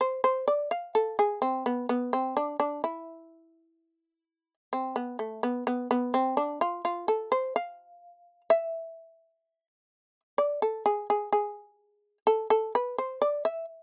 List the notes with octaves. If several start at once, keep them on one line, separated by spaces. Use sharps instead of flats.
C5
C5
D5
F5
A4
G#4
C4
B3
B3
C4
D4
D4
E4
C4
B3
A3
B3
B3
B3
C4
D4
F4
F4
A4
C5
F5
E5
D5
A4
G#4
G#4
G#4
A4
A4
B4
C5
D5
E5